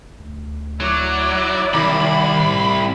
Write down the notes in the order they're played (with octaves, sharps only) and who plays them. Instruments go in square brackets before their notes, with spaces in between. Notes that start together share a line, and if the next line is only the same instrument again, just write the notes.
[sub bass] D2
[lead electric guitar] F#3 [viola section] E4 D5
[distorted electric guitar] C2 [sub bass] D#3 [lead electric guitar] B5
[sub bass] A2